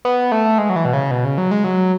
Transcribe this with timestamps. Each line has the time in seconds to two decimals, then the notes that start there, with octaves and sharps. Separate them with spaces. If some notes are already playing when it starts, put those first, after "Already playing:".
0.05 B3
0.32 A3
0.58 G#3
0.70 F#3
0.76 E3
0.85 B2
0.93 C#3
1.11 B2
1.25 C#3
1.38 F#3
1.51 G#3
1.64 F#3